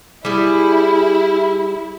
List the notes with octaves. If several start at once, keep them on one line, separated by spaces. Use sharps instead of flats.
G3 E4 G#4